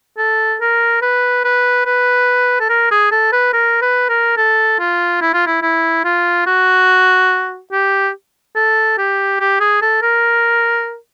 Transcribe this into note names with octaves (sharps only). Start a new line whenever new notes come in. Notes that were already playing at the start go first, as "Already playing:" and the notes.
A4
A#4
B4
B4
B4
A4
A#4
G#4
A4
B4
A#4
B4
A#4
A4
F4
E4
F4
E4
E4
F4
F#4
G4
A4
G4
G4
G#4
A4
A#4